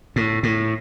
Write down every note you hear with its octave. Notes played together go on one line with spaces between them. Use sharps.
A2
A2